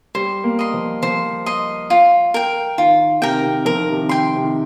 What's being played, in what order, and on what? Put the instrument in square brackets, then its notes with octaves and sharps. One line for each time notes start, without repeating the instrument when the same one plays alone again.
[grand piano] G3 [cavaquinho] C5
[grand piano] A#3
[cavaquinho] D#5 C6
[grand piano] F3
[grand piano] F3 [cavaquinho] C5
[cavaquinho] D#5 C6
F4
A#4 G5
[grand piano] D#3 [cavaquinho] F4
[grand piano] C3 [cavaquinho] A#4 G5
[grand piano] D#3
C3
[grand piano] F3 [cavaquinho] A#4
[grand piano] D#3
C3
D#3
[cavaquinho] G5 C6
[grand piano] C3
D#3